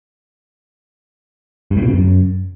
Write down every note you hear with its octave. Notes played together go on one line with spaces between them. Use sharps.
G2
A2
B2
C#3
F#2